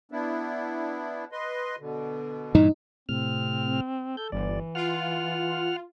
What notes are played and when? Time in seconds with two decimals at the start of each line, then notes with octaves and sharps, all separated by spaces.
0.12 B3 D4 E4
1.32 B4 D#5 C6
1.79 B2 D3
2.55 G2 A#2 E3 D#4
3.09 A2 C3 C4 F6
4.17 A4 G6
4.32 G1 E3 D5
4.75 F4 F#5 F6